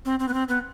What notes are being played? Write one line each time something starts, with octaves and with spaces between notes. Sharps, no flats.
C4
C4
B3
C4
B3